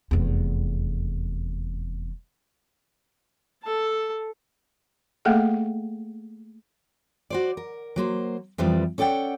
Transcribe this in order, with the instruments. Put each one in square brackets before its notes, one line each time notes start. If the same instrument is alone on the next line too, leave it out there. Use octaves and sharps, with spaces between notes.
[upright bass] F1 E2
[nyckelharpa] A4 A5
[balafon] A3 A#3 G#4 A4 E5 F5
[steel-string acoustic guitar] F#4 C5 D5
A#4
F#3 A#3 C5
F2 E3 F3 G3
C#4 A4 D5 F#5 G5